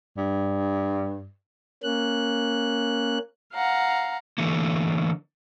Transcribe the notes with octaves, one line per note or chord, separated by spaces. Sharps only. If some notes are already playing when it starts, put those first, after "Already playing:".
G2
A#3 C#4 F#6
F5 F#5 A#5
D3 E3 A3 A#3